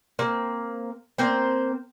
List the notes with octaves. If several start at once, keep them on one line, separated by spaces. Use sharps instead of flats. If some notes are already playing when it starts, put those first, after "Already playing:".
A#3 C4
A#3 C4 C5